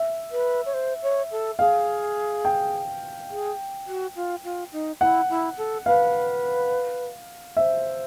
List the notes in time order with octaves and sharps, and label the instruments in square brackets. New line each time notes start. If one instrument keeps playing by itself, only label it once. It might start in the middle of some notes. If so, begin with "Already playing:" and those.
Already playing: [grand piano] E5
[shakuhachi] B4
C#5
C5
C#5
A4
[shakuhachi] G#4 [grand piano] F5
[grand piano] G5
[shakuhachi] G#4
F#4
F4
F4
D#4
[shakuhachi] E4 [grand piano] F#5
[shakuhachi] E4
A4
[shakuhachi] B4 [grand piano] F5
[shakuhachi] C5 [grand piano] E5